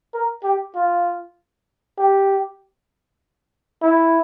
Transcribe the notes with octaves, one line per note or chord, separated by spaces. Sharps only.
A#4
G4
F4
G4
E4